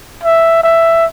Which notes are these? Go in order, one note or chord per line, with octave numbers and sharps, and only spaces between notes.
E5
E5